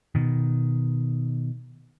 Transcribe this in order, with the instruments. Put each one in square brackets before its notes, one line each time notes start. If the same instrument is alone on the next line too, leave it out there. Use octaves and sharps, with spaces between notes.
[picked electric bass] B2 D#3